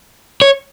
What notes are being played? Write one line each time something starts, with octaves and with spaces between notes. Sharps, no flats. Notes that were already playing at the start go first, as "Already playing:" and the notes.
C#5